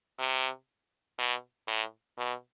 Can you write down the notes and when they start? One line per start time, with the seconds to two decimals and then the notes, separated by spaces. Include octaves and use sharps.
0.19 C3
1.18 B2
1.67 A2
2.18 B2